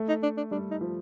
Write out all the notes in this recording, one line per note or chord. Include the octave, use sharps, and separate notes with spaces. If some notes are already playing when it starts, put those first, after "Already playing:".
Already playing: A3
D#4
D4
D4
G3 D4
D#4
F3